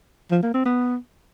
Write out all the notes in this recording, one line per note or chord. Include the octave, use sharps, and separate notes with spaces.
F3
A#3
C4
B3